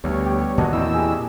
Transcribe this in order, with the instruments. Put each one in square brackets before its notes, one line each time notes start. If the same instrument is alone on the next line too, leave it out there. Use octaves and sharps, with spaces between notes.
[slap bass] D2 [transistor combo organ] G3 B3 C#5
[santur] G4
[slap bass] A#2 D#3 [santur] D4 F#4 D#5
[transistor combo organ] E2 E4 E6 [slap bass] A#2 G#3 C4
[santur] G4 G#4